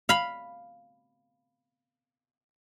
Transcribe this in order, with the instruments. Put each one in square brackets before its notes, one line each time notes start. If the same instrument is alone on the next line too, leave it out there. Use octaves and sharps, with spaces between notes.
[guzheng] F5 B5